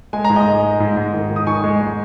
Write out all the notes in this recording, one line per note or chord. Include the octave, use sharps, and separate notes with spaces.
G#3 G#5
A#5
G#2
D#5 G#5
G#3
G#3
G#2
G#2
D#3
D#3
D#6
D#3 G#5 C#6
G#3
G#3